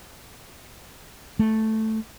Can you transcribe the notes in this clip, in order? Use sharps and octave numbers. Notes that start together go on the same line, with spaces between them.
A3